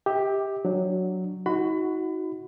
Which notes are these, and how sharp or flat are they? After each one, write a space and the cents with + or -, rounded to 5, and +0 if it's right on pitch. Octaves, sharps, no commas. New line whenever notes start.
G4 +10 E5 -45
F#3 +0 D4 +0
D#4 +40 F#4 +0 B5 +30